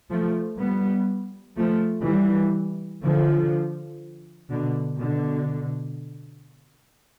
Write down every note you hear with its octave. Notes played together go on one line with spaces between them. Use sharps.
F3 A3
G3 B3
F3 A3
E3 G3
D3 F3
B2 D3
B2 D3